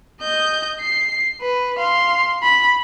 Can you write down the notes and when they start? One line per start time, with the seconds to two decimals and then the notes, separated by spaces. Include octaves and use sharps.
0.21 D#5 G6
0.81 C7
1.41 B4
1.79 F5 C6
2.43 B5